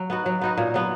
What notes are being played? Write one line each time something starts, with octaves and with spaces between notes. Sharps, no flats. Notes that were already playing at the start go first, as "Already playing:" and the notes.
Already playing: F#3
B3 D#4 F#4
F#3
B3 D#4 F#4
A#2
F#3 B3